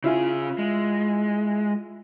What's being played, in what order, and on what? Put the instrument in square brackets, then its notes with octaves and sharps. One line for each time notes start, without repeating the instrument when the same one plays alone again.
[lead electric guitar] C#3 G#4 [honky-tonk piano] E4 F4
[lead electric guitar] G#3